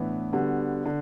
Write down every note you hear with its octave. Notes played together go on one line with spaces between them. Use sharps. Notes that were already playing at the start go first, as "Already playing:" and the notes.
Already playing: A2 E3 B3 D4
D3 G3 B3 F#4
D3